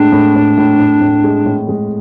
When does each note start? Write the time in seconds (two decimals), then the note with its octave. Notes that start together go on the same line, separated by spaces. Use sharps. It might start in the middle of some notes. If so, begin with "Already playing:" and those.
Already playing: A2 G#3 D4
0.12 A2
0.35 A2
0.57 A2
0.79 A2
1.01 A2
1.24 G#3
1.46 A2
1.69 G#3